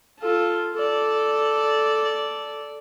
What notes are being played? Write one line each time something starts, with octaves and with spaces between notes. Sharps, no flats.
F4 A4
A4 D5